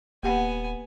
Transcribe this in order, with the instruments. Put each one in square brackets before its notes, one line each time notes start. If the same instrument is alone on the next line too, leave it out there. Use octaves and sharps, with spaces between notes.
[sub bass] D#1 [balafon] A#3 G4 F#5 [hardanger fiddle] B3 G#5